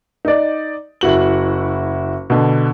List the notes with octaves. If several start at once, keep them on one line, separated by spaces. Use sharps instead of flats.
D#4 D5
F#1 E4 F#4 F#7
B2 D3